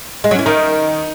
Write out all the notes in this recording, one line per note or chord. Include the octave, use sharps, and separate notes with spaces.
G#3
F#3
E3 C#4
D#3 D#4